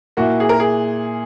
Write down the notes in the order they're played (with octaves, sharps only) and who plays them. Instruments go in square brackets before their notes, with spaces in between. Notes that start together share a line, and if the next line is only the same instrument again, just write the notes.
[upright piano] A#2 A#3 E4 [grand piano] F#4
[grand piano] G#4
A#4
G#4